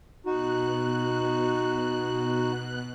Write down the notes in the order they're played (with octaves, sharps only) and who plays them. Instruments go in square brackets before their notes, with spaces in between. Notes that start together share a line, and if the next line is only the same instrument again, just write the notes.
[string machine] B2 F#6 [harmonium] D#4 F#4